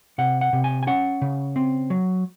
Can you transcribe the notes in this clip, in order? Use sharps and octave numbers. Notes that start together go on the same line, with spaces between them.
C3 F#5
F#5
C3
G#5
G#5
C#4 F#5
C#3
C4
F#3